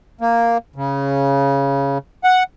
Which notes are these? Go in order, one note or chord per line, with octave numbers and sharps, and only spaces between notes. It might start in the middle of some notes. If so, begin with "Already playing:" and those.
A#3
C#3
F#5